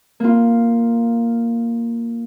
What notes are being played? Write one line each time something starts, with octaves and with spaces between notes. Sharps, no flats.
A#3 F4